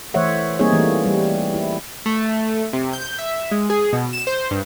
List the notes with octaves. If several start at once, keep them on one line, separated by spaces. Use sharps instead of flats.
E3 A3 C5 C#5 E5 F#5
G3 A#3 C4 D#4 G#4 C#5
E3 A3 A#3
G3
E4
A3
C3
G6
E5
G#3
G#4
B2
E7
C5
G2